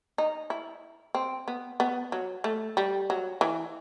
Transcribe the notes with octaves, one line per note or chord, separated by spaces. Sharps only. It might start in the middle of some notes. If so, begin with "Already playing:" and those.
D#4
E4
C4
B3
B3
F#3
A3
G3
F#3
E3